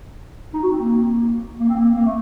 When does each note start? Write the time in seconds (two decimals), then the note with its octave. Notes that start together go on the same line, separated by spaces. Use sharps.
0.54 D#4
0.63 F#4
0.71 C4
0.80 A#3
1.60 A#3
1.69 C4
1.77 A#3
1.96 A#3
2.06 A3